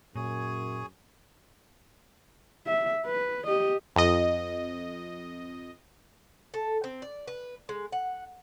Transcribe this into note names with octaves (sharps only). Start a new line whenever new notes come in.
F#2 A#2 G#4 C#5 G#5
E5
B4
G4 D#5
F2 D#5
A4
C4
D5
B4
G#3
F#5